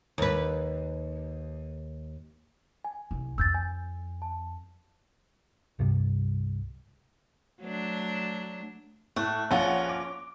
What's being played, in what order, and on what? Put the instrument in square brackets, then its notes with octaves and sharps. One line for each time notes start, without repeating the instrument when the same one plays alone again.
[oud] D#2 B4
[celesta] G#5
[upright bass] C2
[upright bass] F2 [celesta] E6 G6 A6
[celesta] G#5
A5
[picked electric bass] C2 G2 C3 G3
[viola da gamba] F#3 A3 D4
[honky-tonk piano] A2 C#6 F#6 [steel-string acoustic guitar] A3
[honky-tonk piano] A#1 F#5 [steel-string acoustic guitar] C#4 F4
[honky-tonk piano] D6